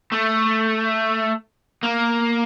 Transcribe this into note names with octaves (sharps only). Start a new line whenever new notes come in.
A3
A#3